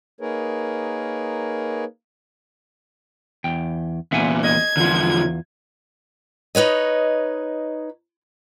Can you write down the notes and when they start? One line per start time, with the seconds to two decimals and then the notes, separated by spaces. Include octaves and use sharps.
0.21 A#3 D#4 G#4 A#4 B4 C#5
3.44 E2 G5
4.12 E2 A#2 E5 F#5 G#5
4.44 D#5 G#6
4.77 E2 D3 F3 F4
6.55 D#4 B4 C#5 D#5